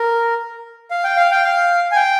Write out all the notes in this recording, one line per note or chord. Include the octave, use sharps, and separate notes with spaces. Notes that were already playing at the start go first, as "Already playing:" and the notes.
Already playing: A#4
F5
G5
F5
G5
F5
G#5
G5